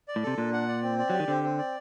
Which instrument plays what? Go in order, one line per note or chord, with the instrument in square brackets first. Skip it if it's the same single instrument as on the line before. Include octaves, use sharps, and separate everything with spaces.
[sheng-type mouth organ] D5
[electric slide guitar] A2
[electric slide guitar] C3 [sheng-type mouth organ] A4
[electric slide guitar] A#2 [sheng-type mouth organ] D4
[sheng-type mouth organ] F#5
D5
C4
D5
[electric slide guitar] F#3 [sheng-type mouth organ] G4
[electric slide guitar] D#3
[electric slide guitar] D3 [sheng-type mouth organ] C4
[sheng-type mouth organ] C4
D5